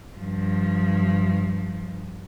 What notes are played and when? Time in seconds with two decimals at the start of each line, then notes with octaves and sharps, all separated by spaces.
0.17 G2 F3